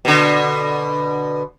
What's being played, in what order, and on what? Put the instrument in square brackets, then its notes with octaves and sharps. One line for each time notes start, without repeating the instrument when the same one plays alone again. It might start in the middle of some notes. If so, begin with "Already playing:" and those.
[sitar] B2 D3